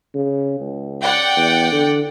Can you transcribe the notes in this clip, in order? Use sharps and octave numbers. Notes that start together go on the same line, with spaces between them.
C#3
C#2
D5 F#5 G5
E2
D3